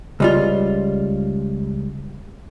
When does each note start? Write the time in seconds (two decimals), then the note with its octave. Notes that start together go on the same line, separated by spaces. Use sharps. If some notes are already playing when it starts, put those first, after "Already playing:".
0.20 C#2 G3 F4